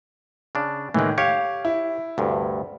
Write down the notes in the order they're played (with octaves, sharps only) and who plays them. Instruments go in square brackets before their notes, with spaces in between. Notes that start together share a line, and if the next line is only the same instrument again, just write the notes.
[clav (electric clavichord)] C#3 D4
[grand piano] A2 D#3 [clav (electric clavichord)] E3 G#3
[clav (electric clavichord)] G4 C#5 [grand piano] F5
[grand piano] E4
[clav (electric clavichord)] D2 G2 C3